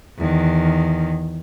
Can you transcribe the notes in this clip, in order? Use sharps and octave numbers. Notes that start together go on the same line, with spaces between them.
E2 D#3